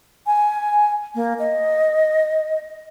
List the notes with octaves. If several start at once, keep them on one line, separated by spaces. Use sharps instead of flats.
G#5
A#3
D#5